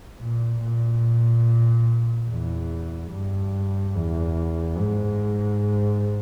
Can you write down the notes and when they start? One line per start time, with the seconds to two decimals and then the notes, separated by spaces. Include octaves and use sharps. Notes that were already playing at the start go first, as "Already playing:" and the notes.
0.20 A#2
0.62 A#2
2.29 E2
3.12 G2
3.96 E2
4.79 G#2